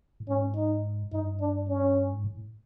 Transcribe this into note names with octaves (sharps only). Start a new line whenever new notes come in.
A2
G#2 C#4
D#4
G2 D#4
D4
C#4
G#2
A2